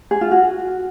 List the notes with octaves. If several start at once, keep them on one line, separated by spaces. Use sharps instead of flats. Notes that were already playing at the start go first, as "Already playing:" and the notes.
G#4
F4
F#4